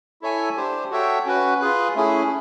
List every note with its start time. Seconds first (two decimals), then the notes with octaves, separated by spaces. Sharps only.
0.21 E4 A4 C#5 E5 G#5
0.57 D4 G4 C5
0.91 F#4 A4 C#5 E5 G5
1.26 C#4 F#4 B4
1.60 F4 G#4 B4
1.95 A3 C#4 E4 G#4